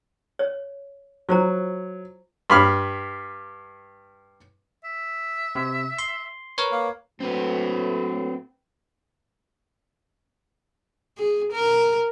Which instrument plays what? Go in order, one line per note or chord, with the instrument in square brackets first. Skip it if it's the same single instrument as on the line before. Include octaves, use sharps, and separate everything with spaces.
[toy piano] C#5
[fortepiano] F#3 [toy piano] F4 C5 A#5
[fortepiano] G2 B5 F6
[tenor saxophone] E5
[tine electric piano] C3
C6
A#4 B4 C#5
[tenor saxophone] A#3
[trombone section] A2 F#3 A3 [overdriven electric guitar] C4 B4
[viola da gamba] G#4
A#4